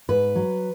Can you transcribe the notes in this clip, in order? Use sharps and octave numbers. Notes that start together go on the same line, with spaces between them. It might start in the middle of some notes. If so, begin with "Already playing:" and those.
G#2 B4
F#3